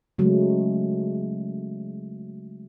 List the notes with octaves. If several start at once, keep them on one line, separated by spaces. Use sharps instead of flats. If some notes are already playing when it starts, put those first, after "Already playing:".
C#3 F#3 G#3 A3